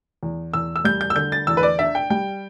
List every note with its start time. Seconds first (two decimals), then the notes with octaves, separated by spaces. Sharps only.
0.23 E2
0.54 E2 E6
0.76 E6
0.84 G3 G6
1.01 G6
1.10 E6
1.16 D3 G6
1.32 A6
1.47 E2 E6
1.57 B4
1.63 D5
1.79 D4 E5
1.95 G5
2.10 G3 G5